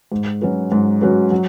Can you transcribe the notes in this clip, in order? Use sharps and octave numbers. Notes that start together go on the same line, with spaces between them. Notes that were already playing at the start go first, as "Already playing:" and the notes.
G#2
F#3 C#4 F#4 B4
G#2
F#3 C#4 F#4 B4
F#3